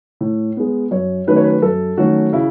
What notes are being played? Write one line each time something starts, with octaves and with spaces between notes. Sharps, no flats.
A2
G#3 B3
F#2 C#5
D#3 F#3 A3 C#4 B4
C#5
B4
F#2 A4
D#3 F#3 A3 C#4 F#4
C#3 E4